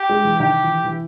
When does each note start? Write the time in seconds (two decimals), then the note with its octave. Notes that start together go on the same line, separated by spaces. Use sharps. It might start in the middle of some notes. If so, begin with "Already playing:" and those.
Already playing: G4
0.09 G#3
0.25 E3
0.39 D#3 G4
0.63 E3
0.84 E3